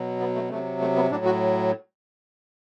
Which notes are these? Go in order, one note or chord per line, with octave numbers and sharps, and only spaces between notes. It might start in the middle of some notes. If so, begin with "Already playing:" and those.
Already playing: B2 F#3
B3
A3
C3 F#3 A3
A3
B3
A2 F#3 D4
F#4